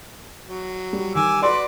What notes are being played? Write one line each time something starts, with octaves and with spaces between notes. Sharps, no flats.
F#3
G3
D#3 G#5 D6 E6
F#4 B4 D5 C6 D6